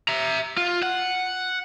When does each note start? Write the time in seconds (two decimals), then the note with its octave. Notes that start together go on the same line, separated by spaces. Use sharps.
0.08 E5 A#5
0.57 F4
0.83 F#5